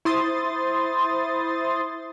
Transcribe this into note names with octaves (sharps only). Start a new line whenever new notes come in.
E4 C5 C6 D#6 A6